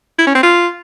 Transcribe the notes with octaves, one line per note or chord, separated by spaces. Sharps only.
E4
C#4
C4
F4